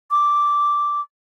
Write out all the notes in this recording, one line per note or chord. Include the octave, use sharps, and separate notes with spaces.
D6